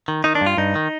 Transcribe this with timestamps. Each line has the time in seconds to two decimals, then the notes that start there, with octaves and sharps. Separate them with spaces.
0.08 D#3
0.24 D#3 D#4
0.35 D4
0.41 G2
0.46 F4
0.58 G2 D#4
0.75 D#3